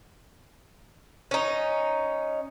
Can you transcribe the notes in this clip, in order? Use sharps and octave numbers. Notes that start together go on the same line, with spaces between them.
C#4 D#4